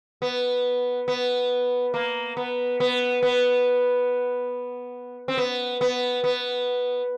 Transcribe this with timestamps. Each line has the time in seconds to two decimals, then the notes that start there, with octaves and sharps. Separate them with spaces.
0.22 B3
1.08 B3
1.94 A#3
2.37 B3
2.80 B3
3.23 B3
5.28 C4
5.38 B3
5.81 B3
6.24 B3